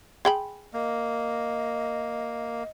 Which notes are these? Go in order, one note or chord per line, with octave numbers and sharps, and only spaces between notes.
G#4 G5 B5
A#3 D#5